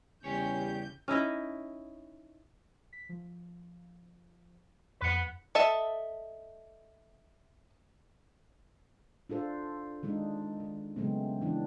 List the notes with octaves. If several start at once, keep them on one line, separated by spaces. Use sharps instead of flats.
E2 C#3 G3 C#4 G4 C#5 G6
C#4 D#4 E4 D#5
B6
F3
F2 B4 F#5 B6
A4 D#5 E5 A5
D4 F4 A4 C5
D#3 G#3 D4 D#4
D#3
C#3 F#3 G#3 A3 B3 C4
E3 D4